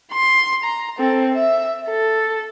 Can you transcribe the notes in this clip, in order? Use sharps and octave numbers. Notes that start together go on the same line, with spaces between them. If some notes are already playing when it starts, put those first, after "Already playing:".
C6
A#5
C4 A4
E5
A4